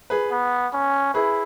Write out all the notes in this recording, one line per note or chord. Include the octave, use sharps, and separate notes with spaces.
G#4 B4
B3
C#4
E4 G#4 B4